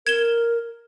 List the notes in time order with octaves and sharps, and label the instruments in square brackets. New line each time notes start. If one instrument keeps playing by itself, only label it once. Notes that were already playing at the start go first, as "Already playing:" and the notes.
[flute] A#4 [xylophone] G#6 E7 G7